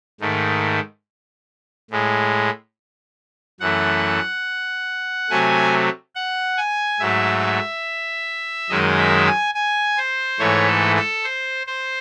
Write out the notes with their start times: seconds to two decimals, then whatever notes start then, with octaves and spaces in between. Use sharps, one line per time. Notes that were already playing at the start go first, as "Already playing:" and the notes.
0.20 G#2 D#3 A3
1.91 A2 G#3
3.60 F#2 E3 A3 F#5
5.30 C3 F#3 A3 G#5
6.15 F#5
6.57 G#5
7.00 G#2 F#3 A3 E5
8.69 F#2 D#3 G#3 D#5
8.98 E5
9.26 G#5
9.54 G#5
9.98 C5
10.39 G#2 E3 A3 C#5
10.68 A4
10.96 A4
11.24 C5
11.67 C5